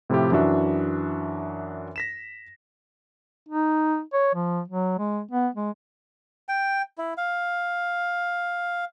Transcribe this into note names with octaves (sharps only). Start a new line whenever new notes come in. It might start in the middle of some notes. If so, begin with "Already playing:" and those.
A2 C3 F3 E4 F4 G4
F#2 E3 D4 F#4 E5
A#6 B6 E7
D#4
C#5
F3
F#3
G#3
B3
G#3
G5
E4
F5